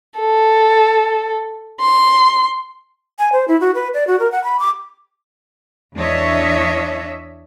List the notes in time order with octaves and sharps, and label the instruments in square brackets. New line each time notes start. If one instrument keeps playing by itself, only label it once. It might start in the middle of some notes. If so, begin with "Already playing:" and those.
[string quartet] A4
C6
[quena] G#5
C5
E4
F#4
B4
D5
F#4
A#4
F#5
B5
D6
[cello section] E2 D4 C#5 D#5 E5